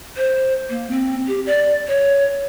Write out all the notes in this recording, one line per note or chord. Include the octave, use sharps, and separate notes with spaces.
C5
A#3
C4
G4
D5
C#5